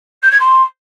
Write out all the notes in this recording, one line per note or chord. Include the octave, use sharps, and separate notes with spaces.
G6
G#6
C6